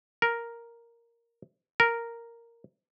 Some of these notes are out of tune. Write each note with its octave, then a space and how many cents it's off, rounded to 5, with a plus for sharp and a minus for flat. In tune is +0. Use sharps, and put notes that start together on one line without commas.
A#4 +0
A#4 -5